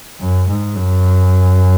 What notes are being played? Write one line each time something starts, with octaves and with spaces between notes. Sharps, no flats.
F#2
G#2
F#2